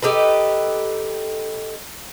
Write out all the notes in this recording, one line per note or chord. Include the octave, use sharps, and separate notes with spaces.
D#4 G4 A4 B4